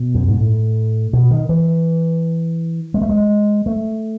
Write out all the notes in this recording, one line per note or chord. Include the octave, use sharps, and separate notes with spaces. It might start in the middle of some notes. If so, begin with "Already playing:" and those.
Already playing: B2
F#2
G#2
A2
B2
D#3
E3
G#3
A3
G#3
A3